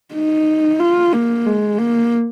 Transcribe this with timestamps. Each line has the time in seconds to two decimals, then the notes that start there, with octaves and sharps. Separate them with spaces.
0.15 D#4
0.80 F4
1.13 A#3
1.46 G#3
1.78 A#3